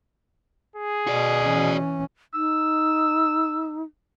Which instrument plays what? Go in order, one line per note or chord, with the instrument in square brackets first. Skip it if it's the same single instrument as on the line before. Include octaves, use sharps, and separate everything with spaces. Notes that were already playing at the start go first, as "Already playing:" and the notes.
[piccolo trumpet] G#4
[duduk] B2 [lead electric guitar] F#4 D5
[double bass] E3 C#4
[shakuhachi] D#4 [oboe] E6